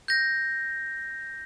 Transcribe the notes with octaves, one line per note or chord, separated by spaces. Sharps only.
G6 A#6